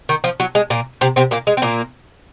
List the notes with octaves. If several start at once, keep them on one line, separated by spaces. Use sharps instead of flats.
D#3
F3
F#3
G#3
A#2 A#3
C3 C4
C3 C4
A#2 A#3
G#3
C4
A#2 A#3